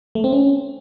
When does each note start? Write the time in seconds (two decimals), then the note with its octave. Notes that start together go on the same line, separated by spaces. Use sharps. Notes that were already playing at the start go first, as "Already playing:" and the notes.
0.15 A3
0.24 C4
0.33 C#4